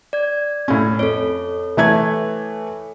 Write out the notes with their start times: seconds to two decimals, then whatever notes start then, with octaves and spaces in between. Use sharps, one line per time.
0.13 D5 G#6
0.68 A2 C#4
0.99 F2 A4 C#5
1.77 E3 A3 G#6